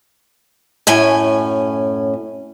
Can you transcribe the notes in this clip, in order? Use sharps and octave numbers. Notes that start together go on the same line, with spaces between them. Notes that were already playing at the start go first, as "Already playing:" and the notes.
F#2 A2 C#4 G#5